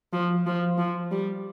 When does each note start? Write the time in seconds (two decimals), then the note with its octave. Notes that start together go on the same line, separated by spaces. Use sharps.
0.13 F3
0.46 F3
0.78 F3
1.11 G3